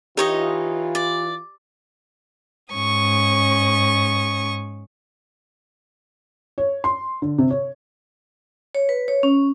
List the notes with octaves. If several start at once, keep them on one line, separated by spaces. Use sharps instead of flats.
E3 D#4 F4 G4 C#5 D#5
D5
G#2 C#4 C#6 D#6
C#5
C6
D3
C3
C#5
C#5
B4
C#5
C#4